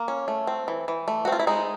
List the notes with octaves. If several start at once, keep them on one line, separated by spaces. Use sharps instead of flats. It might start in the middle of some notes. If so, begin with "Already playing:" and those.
Already playing: A#3
C#4
A3
C4
E3
E3
A3
F#4
C4 F4
E4
G#3 D#4